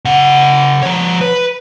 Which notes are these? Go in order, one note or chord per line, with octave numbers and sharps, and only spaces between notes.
C#3 F#5
F3 C#5
B4